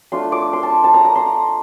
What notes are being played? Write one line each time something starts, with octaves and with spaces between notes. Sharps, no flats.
A3 D4 F4 C6
D6
C6
A5
A5
A#5
A#5
C6